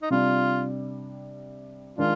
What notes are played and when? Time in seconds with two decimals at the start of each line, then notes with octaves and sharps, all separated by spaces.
0.02 D#4
0.10 C3 G3 D4 F4
1.98 D#3 G#3 D4 F4